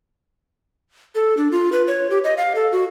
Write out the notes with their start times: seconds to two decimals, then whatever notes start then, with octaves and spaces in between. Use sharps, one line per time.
1.15 A4
1.37 D4
1.52 F4
1.72 B4
1.88 C#5
2.10 G4
2.24 D#5
2.37 F5
2.55 A4
2.72 F#4